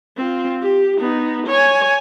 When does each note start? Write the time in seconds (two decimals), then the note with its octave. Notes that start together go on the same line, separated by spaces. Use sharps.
0.17 C4 F4
0.62 G4
1.00 B3 D#4
1.47 C#5 G#5